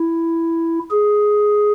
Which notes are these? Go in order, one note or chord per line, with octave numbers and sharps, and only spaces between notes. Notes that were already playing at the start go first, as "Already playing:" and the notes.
Already playing: E4
G#4